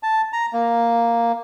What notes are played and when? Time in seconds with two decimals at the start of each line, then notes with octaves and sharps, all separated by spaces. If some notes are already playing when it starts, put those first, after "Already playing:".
0.03 A5
0.33 A#5
0.53 A#3